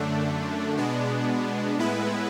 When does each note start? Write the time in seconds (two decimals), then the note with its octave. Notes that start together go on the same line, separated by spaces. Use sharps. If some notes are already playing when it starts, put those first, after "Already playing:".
Already playing: F#2 D3 A3 D4
0.77 B2 G#3 B3 D4
1.77 A2 G#3 B3 E4 B4